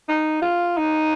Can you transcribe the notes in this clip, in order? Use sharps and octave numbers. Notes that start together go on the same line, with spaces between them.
D#4
F4
D#4